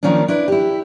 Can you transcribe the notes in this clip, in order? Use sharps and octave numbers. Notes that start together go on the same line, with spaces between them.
D#3 F3 A#3 C#4 D4
D4 E4 B4
E4 G4